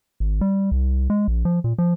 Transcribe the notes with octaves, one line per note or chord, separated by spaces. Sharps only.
G#1
G3
C2
G#3
A#1
F3
A#2
F3